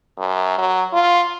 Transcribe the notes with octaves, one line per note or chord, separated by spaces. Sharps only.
F#2
F#3
F4